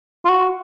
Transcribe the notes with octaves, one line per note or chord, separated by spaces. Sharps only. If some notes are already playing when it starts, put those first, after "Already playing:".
F4
F#4